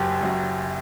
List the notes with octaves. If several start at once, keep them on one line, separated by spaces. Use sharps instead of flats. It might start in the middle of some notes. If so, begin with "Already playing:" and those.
Already playing: F#1 F#2 F#3 G4
F#1 F#2 F#3